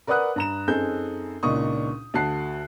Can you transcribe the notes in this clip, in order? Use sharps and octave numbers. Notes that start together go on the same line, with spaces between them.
A#4 B4 D5 F#5 D#6 F#6
G2 A#5 E7
F#2 C4 D#4 G#4 A4 G6
C#2 A#2 D4 D#4 C#6 D#6
D2 F#4 F#5 A5 F#6 C7